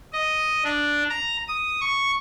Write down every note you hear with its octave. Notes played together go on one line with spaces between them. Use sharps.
D#5
D4
A#5
D#6
C#6